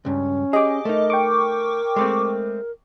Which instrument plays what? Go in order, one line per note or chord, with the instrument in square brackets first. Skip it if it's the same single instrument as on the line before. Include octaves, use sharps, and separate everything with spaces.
[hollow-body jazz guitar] C#2 G2 [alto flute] C#4
[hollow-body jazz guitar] G4 G#4 [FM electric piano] D#5 D6
[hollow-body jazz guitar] A3 D#4 [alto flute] A#4
[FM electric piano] G5 C#6 D6
[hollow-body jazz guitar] G#3 A3 C4